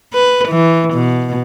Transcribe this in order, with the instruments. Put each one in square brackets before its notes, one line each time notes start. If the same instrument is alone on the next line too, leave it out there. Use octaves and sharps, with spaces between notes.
[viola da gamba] B4
E3
B2